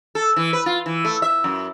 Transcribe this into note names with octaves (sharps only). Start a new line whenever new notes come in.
A4
E3
B4
F4
E3
A3
E5
F#2